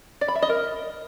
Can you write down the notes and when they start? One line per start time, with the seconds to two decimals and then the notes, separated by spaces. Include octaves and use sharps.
0.21 D5
0.28 B5
0.35 E5
0.42 D#5
0.50 A#4